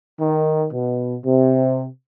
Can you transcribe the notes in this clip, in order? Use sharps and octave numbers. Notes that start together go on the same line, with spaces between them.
D#3
B2
C3